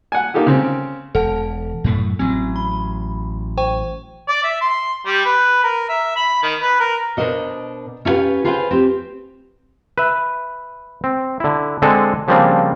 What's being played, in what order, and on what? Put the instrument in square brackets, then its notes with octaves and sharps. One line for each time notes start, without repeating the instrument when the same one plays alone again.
[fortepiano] F#5 G#5
A#3 D#4 F4 G4 A4
C#3 C4
[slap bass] E1 [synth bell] A4 F#5 A5
[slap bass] F#2 A2 A3
[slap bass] A1 F#3 [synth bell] C4
[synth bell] B5
C5 G5 C#6
[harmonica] D5
E5
C6
G3
B4
A#4
E5
B5
D#3
B4
A#4
[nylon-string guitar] B2 D4 A#4 C5 D#5 F#5
C#4 E4 F4 G4 B4 F#5
F4 G#4 B4 C5 F#5 G5
C4 G4
[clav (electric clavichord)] B4 E5
C4
D3 E4
D3 G#3 C4 A4 F#5 G#5
C#3 F3 G3 A#3 C4 D4